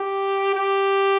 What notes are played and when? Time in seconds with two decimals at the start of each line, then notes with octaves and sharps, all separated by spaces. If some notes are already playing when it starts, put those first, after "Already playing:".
Already playing: G4
0.54 G4